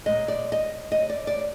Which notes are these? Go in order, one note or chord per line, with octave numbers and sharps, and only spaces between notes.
A#2 G#3 D#5
D5
D#5
D#5
D5
D5